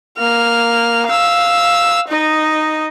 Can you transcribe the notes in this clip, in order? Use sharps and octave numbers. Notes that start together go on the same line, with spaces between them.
A#3 F6
F5 E6
D#4 D#5